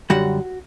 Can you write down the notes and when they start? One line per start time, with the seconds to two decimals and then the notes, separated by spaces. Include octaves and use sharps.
0.10 F#2 D3 G3 F#4 F#5